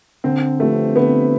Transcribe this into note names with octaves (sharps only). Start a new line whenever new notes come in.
D3 C4
F3 A3 C4 G4 B4
D3 B3